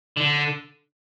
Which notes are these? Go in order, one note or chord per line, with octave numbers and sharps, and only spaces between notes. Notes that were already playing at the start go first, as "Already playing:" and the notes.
D3